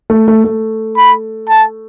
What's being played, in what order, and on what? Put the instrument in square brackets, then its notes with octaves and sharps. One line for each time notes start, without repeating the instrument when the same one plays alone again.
[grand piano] A3
A3
A3
[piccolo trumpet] B5
A5